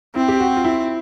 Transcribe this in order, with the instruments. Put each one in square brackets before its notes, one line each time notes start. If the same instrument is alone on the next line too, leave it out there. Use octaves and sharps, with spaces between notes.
[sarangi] C4 [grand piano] E4
[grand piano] G4
F#4
F4
E4